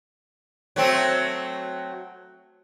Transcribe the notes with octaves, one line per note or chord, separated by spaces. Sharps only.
F#3 A3 C4